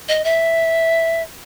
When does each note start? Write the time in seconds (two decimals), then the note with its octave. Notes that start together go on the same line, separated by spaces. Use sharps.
0.09 D#5
0.24 E5